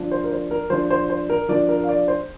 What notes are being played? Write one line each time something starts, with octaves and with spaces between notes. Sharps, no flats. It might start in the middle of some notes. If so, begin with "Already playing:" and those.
Already playing: F3 D4
C5
A#4
C5
A#4
F3 D4 C5
C5
C5
A#4
F3 D4 D5
A#4
F5
D5
C5